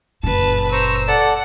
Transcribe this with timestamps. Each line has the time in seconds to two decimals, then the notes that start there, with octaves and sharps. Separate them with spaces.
0.23 F#1 A#2 B4 A5
0.72 C5 A#5 C#6 E6
1.08 A4 D5 F#5 A5